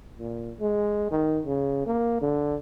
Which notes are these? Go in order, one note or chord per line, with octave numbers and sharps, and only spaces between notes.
A#2
G#3
D#3
C#3
A#3
D3